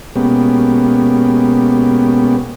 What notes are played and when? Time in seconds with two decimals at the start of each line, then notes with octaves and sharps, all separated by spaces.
0.16 B2 G#3 A#3 B3 C#4 G4